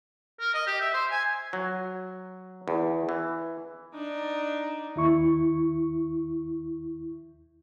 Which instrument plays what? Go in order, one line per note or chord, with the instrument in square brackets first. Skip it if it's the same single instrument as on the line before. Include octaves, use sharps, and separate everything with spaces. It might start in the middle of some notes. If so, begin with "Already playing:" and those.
[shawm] A#4
D#5
G4
E5
C5
G#5
[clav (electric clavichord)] F#3
E2
E3
[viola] D4 D#4
[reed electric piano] D#2 E4 C#6